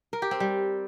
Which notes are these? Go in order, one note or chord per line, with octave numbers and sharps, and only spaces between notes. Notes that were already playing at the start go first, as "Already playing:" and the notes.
A#4
G4
C4
G3